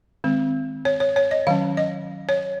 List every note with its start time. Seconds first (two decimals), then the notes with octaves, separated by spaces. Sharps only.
0.24 D#3 G#3 C4
0.85 C#5
1.00 C#5
1.16 C#5
1.31 D#5
1.47 D#3 F#3 C#4 F5
1.77 D#5
2.29 C#5